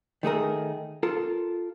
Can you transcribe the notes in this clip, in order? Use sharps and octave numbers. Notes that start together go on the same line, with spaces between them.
D#3 A3 G#4 A#4
F4 A4 A#4